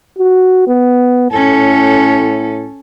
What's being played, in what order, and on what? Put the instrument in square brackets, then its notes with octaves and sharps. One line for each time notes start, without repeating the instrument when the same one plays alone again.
[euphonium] F#4
B3
[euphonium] A2 [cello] C#4 A4